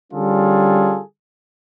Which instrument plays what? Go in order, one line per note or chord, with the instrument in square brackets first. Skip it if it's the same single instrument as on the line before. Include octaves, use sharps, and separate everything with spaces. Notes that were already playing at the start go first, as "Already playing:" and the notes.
[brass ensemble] D3 G3 C#4 F4 G#4 A4